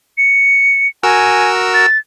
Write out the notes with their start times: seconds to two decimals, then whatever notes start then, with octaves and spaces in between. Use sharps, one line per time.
0.18 C#7
1.03 F#4 A#4 G#5 E6
1.74 A6